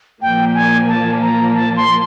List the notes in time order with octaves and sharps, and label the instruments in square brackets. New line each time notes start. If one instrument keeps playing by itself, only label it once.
[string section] A#2 F3 A#3 [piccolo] G5
[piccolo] G#5
A5
A#5
A5
C6